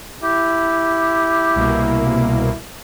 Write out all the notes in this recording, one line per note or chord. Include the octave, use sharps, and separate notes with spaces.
E4 G4
C2 B2 A#3